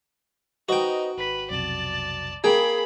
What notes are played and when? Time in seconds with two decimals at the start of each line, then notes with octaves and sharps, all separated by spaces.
0.69 D#4 F#4 B4 C5 D#5 G5
1.18 G#1 B4 B6
1.50 B1 F2 C3 D5 A5
2.44 A#3 G#4 G5 B5